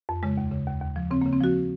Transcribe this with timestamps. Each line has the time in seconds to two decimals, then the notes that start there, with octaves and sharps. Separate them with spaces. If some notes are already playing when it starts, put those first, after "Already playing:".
0.09 F2
0.23 C#3 G#3
0.37 D#2
0.52 C#3
0.67 D#2
0.82 D#2
0.96 F3
1.11 C#3 C4
1.22 C#3 A#3
1.33 C4
1.41 F3 F#4